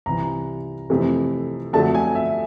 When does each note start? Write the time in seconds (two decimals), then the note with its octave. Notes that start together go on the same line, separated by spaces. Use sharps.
0.06 C2 C3 E3 A#5
0.90 F2 C3 E3 A3
1.73 F2 D3 F#3 A3 A5
1.94 G#5
2.15 E5